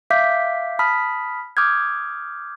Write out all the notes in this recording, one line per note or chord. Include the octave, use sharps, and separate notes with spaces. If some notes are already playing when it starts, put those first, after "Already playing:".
E5 F5 D6 G6 B6
A5 B5 D#6 F6 B6
D6 D#6 F6 G6 G#6